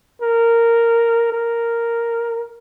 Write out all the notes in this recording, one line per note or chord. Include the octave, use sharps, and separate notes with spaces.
A#4
A#4